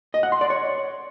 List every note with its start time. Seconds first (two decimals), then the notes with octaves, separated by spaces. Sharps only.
0.14 D#5
0.23 F#5
0.32 C6
0.41 D5
0.50 C#5